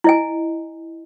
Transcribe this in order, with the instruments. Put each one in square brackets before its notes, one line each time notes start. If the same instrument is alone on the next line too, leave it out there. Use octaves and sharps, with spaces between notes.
[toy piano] E4 D#5 G#5